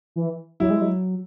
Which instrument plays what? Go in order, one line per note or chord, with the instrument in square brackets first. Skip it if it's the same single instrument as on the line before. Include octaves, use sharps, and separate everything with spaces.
[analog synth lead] E3
[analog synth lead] F#3 [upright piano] E4
[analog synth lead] G#3
F#3